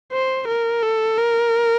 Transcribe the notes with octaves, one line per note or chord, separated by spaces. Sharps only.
C5
A#4
A4
A#4